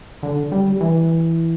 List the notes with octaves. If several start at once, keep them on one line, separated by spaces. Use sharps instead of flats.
D3
G3
E3